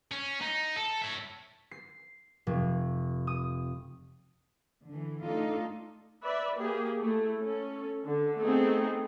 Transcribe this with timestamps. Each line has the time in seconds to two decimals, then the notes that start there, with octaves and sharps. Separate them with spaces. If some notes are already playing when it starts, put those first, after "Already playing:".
0.11 C#4
0.41 D#4
0.77 A4
1.02 C#5 E5
1.71 C7
2.47 F1
3.27 D#6
4.87 D3 E3
5.23 A3 D4 D#4 F4 A4
6.23 B4 D5 E5
6.57 A#3 G4 G#4
6.99 A3 E4
7.42 C#4 A4
8.07 D3
8.41 A3 B3 C4 D#4 G#4